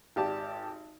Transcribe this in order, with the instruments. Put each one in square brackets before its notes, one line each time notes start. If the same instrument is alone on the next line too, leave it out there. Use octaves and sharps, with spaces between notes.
[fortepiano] G#1 G4 D5 A5